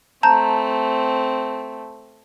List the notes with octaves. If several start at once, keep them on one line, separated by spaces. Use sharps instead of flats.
A3 C4 A5 A#5 G6